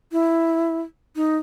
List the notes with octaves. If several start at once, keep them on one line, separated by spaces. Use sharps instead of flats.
E4
D#4